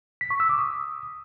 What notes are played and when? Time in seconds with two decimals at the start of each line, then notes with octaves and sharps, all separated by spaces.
0.21 B6
0.30 C#6
0.40 E6
0.49 D6
0.59 D#6